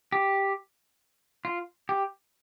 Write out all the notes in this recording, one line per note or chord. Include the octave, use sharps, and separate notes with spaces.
G4
F4
G4